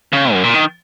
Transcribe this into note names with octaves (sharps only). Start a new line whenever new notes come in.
C#3
F#2
A#2
D#3